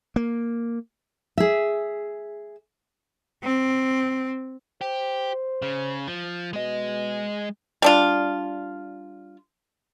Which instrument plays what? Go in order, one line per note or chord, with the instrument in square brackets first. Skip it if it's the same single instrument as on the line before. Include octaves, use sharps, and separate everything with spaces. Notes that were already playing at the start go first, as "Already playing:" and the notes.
[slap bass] A#3
[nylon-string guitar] G#4 E5
[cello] C4
[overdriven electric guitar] G4 [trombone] C5
[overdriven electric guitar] C#3
F3
[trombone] B2 [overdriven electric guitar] G#3 D#5
[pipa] G3 D4 F4